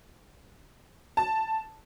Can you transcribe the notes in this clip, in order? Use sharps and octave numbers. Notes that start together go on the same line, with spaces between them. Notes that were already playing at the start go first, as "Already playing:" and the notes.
A5